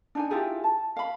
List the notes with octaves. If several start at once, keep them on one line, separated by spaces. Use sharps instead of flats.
D4 D#4 G#5
E4 F4 G4 G#4
A5
F5 B5